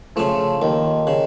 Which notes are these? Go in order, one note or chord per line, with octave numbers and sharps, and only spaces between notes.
C#3 F3 A3
D#2 D#3
C#3